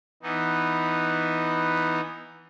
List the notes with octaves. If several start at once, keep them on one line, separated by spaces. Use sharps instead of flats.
E3 B3 D#4